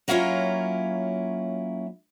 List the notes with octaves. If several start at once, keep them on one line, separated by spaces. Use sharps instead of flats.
F#3 A#3 C#4 E4 F4 C#5